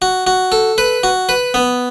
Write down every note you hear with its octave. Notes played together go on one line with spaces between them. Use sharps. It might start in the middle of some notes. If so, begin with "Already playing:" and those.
F#4
F#4
A4
B4
F#4
B4
B3